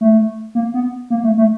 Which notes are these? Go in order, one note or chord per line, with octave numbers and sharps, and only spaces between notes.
A3
A#3
B3
A#3
A3
A3